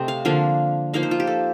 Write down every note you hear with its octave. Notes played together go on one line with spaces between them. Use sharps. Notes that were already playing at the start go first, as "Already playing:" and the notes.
Already playing: C3 A3 C4 D#5
F5
D3 F3 A#3 D4 F5
F3 A#3 D#4 F5
C5
F4
G4
A4